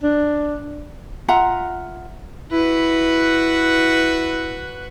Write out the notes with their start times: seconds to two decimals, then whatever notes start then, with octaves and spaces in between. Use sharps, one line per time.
0.03 D4
1.28 F4 E5 F#5 A#5
2.52 E4 F#4 B4